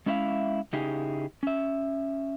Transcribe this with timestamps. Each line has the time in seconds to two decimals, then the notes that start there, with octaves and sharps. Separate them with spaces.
0.06 G#3 C#4 E4 E5 F5
0.73 C#3 D#4 E4 G4 G#4
1.43 C#4 E5